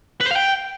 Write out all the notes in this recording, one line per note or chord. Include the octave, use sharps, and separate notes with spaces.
B4
C5
F5
G5